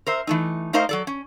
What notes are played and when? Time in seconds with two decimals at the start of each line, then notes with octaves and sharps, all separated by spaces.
0.07 A#4 C5 E5
0.27 E3 A3 D#4
0.73 A3 D#4 A#4 C5 D#5 F5
0.89 F#3 A4 D5
1.07 C#4